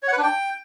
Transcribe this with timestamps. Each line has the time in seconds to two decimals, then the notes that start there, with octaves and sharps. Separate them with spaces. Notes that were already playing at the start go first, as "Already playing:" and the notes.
0.03 C#5
0.08 F#5
0.13 B4
0.18 D4
0.23 G5